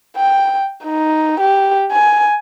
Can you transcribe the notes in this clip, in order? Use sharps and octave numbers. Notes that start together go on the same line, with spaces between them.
G5
D#4
G4
G#5